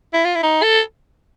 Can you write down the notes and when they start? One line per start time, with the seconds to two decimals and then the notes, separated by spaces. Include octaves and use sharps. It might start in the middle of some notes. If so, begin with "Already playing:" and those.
0.14 E4
0.25 F4
0.35 E4
0.43 D#4
0.63 A4